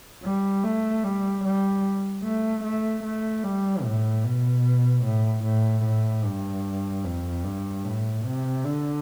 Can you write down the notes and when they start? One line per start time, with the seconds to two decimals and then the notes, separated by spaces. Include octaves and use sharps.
0.23 G3
0.64 A3
1.04 G3
1.44 G3
2.23 A3
2.64 A3
3.04 A3
3.44 G3
3.84 A2
4.24 B2
5.04 A2
5.44 A2
5.84 A2
6.24 G2
7.04 F2
7.44 G2
7.84 A2
8.25 C3
8.64 D3